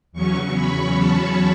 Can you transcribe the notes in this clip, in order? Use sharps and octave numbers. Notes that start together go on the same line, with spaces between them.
E2 C#3 F#3 C#4 C#6
B5
A5